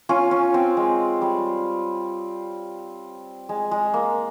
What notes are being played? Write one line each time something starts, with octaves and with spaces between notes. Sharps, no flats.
C#4 F4
C#4
C4
G#3
G3
G#3
G#3
A#3